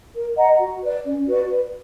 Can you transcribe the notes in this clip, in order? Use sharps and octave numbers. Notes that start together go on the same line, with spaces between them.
A#4
D#5 F#5 A#5
F#4
B4 D5
C#4
F#4 B4 D5
B4